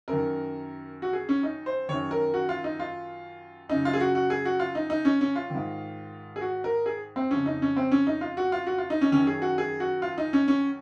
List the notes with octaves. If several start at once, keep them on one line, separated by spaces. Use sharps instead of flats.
F#2 D#3 A#4
F#4
G#4
C#4
D#4
C5
F#2 D#3 C#5
A#4
F#4
F4
D#4
F4
F#2 C#3 D#4
F4
G#4
F#4
F#4
G#4
F#4
F4
D#4
D#4
C#4
C#4
F4
G#2 D#3
G#4
F#4
A#4
G#4
C4
F2 C#3 C#4
D#4
C#4
C4
C#4
D#4
F4
F#4
F4
F#4
F4
D#4
C#4
F#2 D#3 C#4
G#4
F#4
G#4
F#4
F4
D#4
C#4
C#4